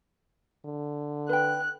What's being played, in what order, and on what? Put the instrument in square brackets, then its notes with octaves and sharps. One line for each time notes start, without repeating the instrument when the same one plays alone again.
[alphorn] D3
[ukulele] B4 G5 [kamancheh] F#6